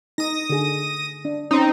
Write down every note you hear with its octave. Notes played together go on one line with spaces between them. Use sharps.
D#4 D#6 A#6
D3 G#4
D4
C4 C#4 D#4